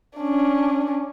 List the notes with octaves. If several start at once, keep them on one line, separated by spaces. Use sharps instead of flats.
C#4 D4